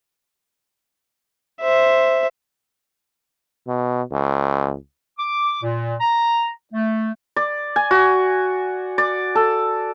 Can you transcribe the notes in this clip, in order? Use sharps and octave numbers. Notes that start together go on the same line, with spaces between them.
C5 E5
B2
C#2
D6
A#2
A#5
A3
D5
G#5
F#4
D5
A4